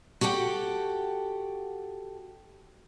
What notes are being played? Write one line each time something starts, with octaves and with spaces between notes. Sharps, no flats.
F#4 G4 A4 F#5 G5